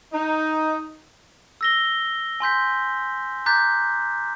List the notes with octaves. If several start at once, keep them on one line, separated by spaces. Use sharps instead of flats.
D#4
E6 A#6 G7
G#5 C6 G6 B6
A#5 D6 F#6 G6 A6 B6